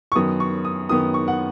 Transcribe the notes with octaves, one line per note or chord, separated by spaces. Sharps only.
C#6
F#2 D#3 B3 D#6
C#6
D#6
F#2 D#3 B3 D#6
C#6
F#5